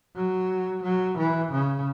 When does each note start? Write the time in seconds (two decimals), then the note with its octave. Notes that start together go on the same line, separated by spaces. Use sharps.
0.16 F#3
0.83 F#3
1.18 E3
1.52 C#3